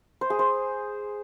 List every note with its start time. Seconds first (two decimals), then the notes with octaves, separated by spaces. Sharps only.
0.21 C5
0.30 G#4
0.39 C5